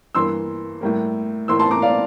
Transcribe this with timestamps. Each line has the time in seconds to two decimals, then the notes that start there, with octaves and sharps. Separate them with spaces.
0.15 G2 E3 A#3 C6 E6
0.81 A2 G3 A#3
1.48 A2 E3 A#3 C6 E6
1.59 A5 C6
1.71 A#5 D6
1.82 D5 F5